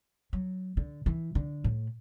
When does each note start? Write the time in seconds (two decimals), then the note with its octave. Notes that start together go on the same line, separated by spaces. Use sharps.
0.33 F#3
0.77 D3
1.06 E3
1.35 D3
1.64 A2